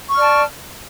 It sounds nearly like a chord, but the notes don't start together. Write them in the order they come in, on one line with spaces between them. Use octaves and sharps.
C#6 F6 D5 A5